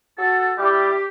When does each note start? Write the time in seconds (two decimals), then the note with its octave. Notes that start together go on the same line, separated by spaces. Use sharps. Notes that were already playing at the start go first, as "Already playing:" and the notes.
0.18 F#4 A4
0.58 G3 E4 G4